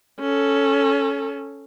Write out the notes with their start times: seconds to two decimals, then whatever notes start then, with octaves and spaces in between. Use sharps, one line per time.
0.20 C#4 A4